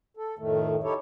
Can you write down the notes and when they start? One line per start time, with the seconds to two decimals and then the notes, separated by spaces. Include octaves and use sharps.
0.17 A4
0.39 F2 A2 D#3 A3
0.84 D#4 E4 G4 A4 C#5